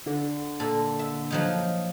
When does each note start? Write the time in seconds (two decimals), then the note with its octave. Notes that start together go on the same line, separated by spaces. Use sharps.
0.06 D3
0.60 A#2 A4
0.99 E5
1.31 F3 F#3 D#4